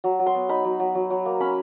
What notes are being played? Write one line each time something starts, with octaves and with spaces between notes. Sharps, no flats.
F#3
F#3
C6
B3
D#4 B5
F#3
F#3
F#3
F#3
A#3
C#4 B5